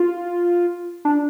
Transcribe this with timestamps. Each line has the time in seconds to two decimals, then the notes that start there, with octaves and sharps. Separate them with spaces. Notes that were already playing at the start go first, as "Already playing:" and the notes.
Already playing: F4
1.05 D4